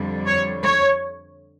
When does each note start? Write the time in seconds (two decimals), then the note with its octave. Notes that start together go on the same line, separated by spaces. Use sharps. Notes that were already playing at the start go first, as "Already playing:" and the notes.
Already playing: F2 D3 G3
0.27 C#5
0.62 C#5